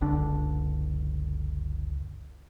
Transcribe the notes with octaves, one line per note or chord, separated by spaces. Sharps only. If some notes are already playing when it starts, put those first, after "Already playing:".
F#1 C#2 D3 D4